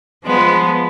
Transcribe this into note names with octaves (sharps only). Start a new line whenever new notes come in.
F3 G#3 B3